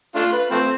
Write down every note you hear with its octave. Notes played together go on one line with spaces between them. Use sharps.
A3 D4 F4
B4
F3 A3 C4